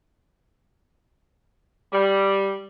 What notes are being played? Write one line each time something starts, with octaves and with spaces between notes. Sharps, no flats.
G3